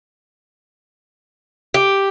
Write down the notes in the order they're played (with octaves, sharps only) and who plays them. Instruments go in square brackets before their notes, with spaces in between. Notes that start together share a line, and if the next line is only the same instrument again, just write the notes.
[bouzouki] G4